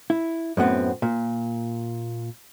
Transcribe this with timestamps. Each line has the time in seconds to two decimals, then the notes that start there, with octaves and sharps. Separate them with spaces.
0.10 E4
0.57 F#2 A2 B3 C4
1.02 A#2